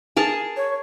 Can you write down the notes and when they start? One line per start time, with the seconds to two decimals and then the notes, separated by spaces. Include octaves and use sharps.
0.17 G#4 A#4 A5
0.57 C#5